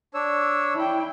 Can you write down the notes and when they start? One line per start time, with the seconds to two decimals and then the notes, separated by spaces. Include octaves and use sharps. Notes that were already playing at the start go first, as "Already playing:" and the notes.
0.14 D4 C#5 E6
0.75 E4 G5